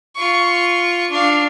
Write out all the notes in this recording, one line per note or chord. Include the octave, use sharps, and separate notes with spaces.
F4 C#6
D4 F5